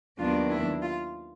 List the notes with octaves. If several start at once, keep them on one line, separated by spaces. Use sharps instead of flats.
D#2 D#3 F#3 B3 D4 F4
E4
F4